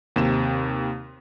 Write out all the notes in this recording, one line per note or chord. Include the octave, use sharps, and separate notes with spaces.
D#2 C3 E7